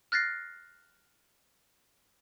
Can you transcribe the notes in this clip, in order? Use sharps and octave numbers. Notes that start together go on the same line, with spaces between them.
F6 F#6 A6 A#6 C7